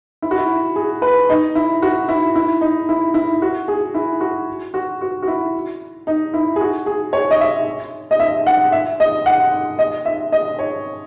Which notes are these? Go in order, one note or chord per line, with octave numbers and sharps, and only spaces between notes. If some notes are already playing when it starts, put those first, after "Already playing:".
E4
F#4
E4
G#4
B4
D#4
E4
F#4
E4
E4
D#4
E4
E4
F#4
G#4
E4
F#4
F#4
F#4
F#4
E4
D#4
E4
G#4
F#4
G#4
C#5
D#5
E5
D#5
E5
F#5
E5
D#5
F#5
D#5
E5
D#5
C#5